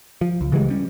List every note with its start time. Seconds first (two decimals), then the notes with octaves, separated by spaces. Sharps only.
0.21 F3
0.41 C#2
0.52 C#3 E3 G3 G#3
0.70 G3 C#4